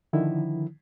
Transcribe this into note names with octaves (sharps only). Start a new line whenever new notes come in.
D3 D#3 F3 E4